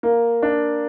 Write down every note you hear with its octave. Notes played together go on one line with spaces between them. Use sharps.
A#3
D4